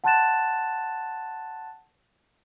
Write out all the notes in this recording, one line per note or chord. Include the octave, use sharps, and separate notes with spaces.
F#5 A5 C6 F#6 A6 E7